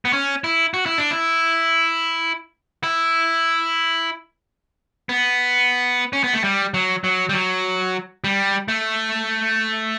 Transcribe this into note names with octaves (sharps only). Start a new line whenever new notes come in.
B3
C#4
E4
F#4
E4
D4
E4
E4
B3
C#4
B3
A3
G3
F#3
F#3
G3
F#3
G3
A3